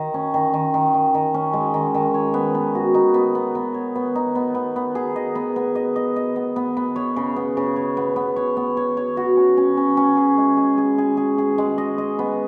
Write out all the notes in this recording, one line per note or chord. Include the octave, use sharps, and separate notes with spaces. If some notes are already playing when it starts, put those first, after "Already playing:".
Already playing: D#3
C#4
D#3
D#3
D#3
D#3
D#3
C#4
G#3
D#3
D#3
C#5
B3
B3
F#4
D#4
B3
B3
B3
C#5
B3
D#4
B3
B3
B3
G#4
D#5
B3
B3
D#5
D#5
D#5
B3
B3
B3
C#5
C#3
B3
C#3
C#5
B3
B3
C#5
B3
C#5
C#5
F#4
C#4
C#4
C#4
C#4
G#4
G#3
G#4
G#4
G#4
G#4
G#4
G#3
D#5
D#5
B3